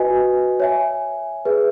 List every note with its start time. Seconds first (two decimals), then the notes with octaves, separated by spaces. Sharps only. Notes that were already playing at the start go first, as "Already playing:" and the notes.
Already playing: F#4 B4 D#5 G#5
0.60 C#5 E5 G#5
1.45 G#4 B4 E5